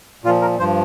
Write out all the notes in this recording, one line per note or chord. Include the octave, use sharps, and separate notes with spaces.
A#2 F3 F4
A#4
G2 F3 C5